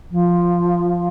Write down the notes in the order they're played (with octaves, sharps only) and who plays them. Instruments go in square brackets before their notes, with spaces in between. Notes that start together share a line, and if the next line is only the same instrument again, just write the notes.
[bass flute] F3